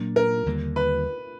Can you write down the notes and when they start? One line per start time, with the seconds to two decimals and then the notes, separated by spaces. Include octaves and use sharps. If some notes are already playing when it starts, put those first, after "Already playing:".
Already playing: A#2 F#3 A#3 D4
0.16 A#4
0.46 D#2 D3 G3 A#3
0.76 B4